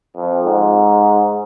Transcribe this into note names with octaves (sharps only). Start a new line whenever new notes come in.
F2
G#2